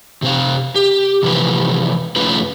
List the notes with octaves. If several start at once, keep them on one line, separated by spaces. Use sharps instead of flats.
C3 C4 F5
G4
C3 E3 F3 G4 B4
F2 A3 C#4 F4 B4